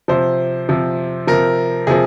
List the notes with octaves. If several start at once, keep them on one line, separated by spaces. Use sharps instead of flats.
C3 F3 C5
C3 F3
C3 F3 A#4
C3 F3 G#4